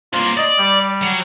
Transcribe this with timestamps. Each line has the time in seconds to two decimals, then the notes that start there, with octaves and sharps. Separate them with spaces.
0.13 C2 A#3 F4
0.37 D5 D#5
0.59 G3
1.02 F#3